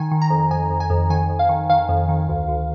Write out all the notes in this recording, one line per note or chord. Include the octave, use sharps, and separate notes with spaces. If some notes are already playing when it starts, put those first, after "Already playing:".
Already playing: D#3 G#5
D#3
A#5
F2
F2 G#5
F2
G#5
F2
D#3 G#5
F2
F5
D#3
D#3 F5
F2
D#3
D2
D2